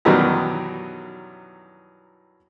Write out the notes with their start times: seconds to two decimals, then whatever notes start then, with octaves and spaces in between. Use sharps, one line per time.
0.05 F#2 B2 D#3 E3 F#3 G3